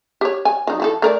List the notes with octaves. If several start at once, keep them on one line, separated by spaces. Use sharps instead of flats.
G4 C#5
G#5
F#3 D#4
E3 F#4 A4
A3 A#4 D5